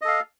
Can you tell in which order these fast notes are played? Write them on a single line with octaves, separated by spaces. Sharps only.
D#5 A4 F5